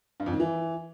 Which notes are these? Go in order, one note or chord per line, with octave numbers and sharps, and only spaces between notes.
G2
F2
D#3
E3